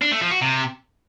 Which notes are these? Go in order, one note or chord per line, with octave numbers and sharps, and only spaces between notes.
D4
A3
F3
F#4
C3